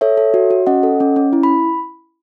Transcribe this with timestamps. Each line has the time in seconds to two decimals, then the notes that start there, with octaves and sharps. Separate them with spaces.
0.01 A4 C#5 E5
0.17 A4
0.34 F#4
0.50 F#4
0.67 C#4 D#5 F#5
0.83 A4
1.00 C#4
1.16 C#4
1.33 E4
1.43 B5